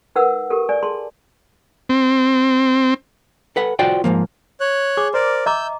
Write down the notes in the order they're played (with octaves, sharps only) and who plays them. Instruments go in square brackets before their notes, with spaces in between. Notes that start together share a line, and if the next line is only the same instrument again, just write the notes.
[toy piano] D#4 A#4 B4 F#5 E6
G4 A4 A#4
D5 G#5
G#4 A5 C6
[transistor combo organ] C4
[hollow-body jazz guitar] A4 B4 F#5
F4 F#4 C5 D5 G5
G#2 D3 F3 A#3
[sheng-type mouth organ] C#5 F#6
[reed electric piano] G#4 [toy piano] D6
[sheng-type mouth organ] A#4 D5 [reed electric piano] C5
[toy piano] D#5 A#5 D6 [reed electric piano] E5 [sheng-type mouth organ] E6 G6